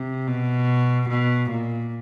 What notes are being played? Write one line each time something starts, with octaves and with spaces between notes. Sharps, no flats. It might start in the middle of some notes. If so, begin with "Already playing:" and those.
Already playing: C3
B2
B2
A#2